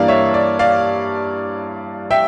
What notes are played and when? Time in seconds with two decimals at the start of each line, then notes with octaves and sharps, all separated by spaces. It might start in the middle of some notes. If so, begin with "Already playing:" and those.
Already playing: G2 E3 A#3 D4 D5 F5
0.08 C#5 E5
0.34 D5
0.59 D5 F5
2.11 E5 G5